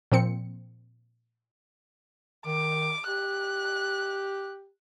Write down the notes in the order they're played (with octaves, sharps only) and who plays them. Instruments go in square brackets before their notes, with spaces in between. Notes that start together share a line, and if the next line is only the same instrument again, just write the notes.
[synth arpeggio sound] A#2 F3 C4 C#7
[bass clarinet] D#3 [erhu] D6
[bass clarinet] G4 [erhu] F#6